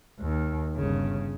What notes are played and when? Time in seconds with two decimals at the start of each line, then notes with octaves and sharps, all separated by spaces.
0.20 D#2
0.76 G1 C#3